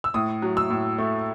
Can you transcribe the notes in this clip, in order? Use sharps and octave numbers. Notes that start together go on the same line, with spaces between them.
E6
A2 D#6
F#3
E6
A2
A3